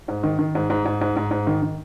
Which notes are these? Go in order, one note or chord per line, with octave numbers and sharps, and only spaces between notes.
G#2
D#3
D#3
G#2
G#2
G#2
G#2
G#2
G#2
D#3
D#3